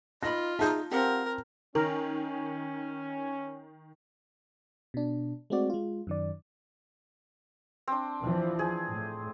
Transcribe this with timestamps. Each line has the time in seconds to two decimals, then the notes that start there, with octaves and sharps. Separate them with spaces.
0.23 D#4 F4 B4 D#5 B5 A#6
0.59 D#4 G#4 E5 A5 G6
0.91 C4 G4 A#4 F5 F#5
1.75 D#3 C#4 A#4
4.94 B2 D4
5.50 G#3 A3 C4 F#4 D5
5.70 G#3 F4
6.07 F#2 D#3 D5
7.88 C4 D4
8.23 E3 F3
8.59 G#4
8.89 A2